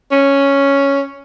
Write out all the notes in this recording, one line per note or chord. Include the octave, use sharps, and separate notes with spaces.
C#4